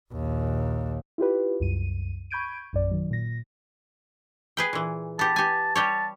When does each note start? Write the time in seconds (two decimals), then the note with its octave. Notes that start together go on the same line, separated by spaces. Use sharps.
0.12 A#1 D#2
1.18 E4 F4 G4 B4
1.60 C2 F#2 D#7
2.31 B5 C#6 G6 G#6 D7 D#7
2.73 A#1 F#2 D5
2.91 D#3 F#3
3.11 A#2 A#6
4.57 G#4 B4 G5
4.73 A#2 E3
5.19 B3 G4 A5
5.36 G4 G#5
5.75 G3 G4 C#5 A5